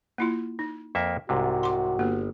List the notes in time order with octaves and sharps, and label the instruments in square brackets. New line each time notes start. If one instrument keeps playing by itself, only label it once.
[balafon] A#3 E4 F4
D#4
[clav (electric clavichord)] F2 A#3 E5
[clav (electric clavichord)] C2 G#2 C3 [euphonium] F#4
[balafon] C6 D6
[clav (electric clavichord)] G1 [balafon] A#3 B3